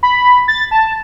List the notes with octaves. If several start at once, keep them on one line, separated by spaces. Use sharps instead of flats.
B5
A6
A5